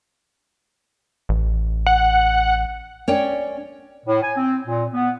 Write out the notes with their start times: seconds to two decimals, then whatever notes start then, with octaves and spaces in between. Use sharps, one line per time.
1.29 A1
1.86 F#5
3.08 C#4 C#5 D5 G5
4.06 A2
4.22 G#5
4.37 C4
4.67 A#2
4.94 B3